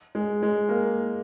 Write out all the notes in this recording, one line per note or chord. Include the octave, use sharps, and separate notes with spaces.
G#3
G#3
A#3